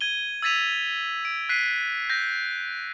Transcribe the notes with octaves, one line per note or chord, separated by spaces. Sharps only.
G#6 D#7 G7
E6 G#6 A6 B6 D#7 F7
D7
F#6 B6 C7 D#7
G6 A#6